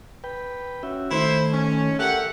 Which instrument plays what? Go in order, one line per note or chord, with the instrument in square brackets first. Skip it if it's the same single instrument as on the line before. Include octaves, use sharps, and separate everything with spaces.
[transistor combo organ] B4 G5
C#4 F#4 E5
[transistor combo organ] D#3 A3 [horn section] E4 C5
[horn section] C#4
[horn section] G4 A#4 F#5 [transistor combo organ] A4 E5